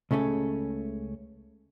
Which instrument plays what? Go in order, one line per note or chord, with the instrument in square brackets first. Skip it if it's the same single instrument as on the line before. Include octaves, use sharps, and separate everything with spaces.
[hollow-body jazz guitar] C#2 C#3 A3 C#4 A4